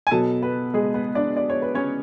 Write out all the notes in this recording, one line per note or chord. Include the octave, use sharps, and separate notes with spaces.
G#5
B2 F#3 A4 A5
B3 B4
G#3 G#4
B3 B4
D4 D5
D5
C#5
B4
C#4 C#5